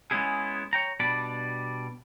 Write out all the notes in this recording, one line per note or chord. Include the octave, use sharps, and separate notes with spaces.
G#3 B3 C#4 E4 G#4
C#5 G5 A#5
B2 G3 D4 D5 B5